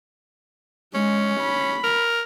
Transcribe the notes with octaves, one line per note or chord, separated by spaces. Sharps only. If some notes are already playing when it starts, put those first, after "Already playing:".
G#3 C#4
B5
A#4